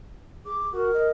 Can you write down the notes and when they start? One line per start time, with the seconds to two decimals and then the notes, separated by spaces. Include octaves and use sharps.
0.45 G#4 D6
0.72 F#4 A#4
0.94 D#5